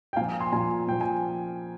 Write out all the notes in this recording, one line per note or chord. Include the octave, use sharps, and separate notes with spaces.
G5
A#2 F3 F5 G#5
G#5 C6
A#2 F3 G#5 C6
A#2 F3 G5
G#5